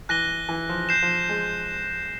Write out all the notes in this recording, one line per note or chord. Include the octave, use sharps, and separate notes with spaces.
E3 F#6 A#6 D#7 G7
E3
F3
G6 C7 E7
F3
G#3